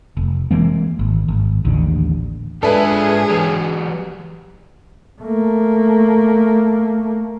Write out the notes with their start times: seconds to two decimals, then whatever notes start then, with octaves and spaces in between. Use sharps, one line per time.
0.17 F1
0.51 E3 G#3 A#3 C4
0.99 G#1
1.28 G#1
1.65 A1 D#2 D3
2.63 G#2 G#3 D4 F4 G#4 A4 B4 E5
3.30 E3 F#3 G4
5.22 A3 A#3